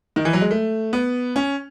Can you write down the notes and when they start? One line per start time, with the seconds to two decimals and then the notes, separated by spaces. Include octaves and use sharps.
0.16 D#3
0.25 E3
0.33 F#3
0.41 G#3
0.51 A3
0.93 B3
1.36 C#4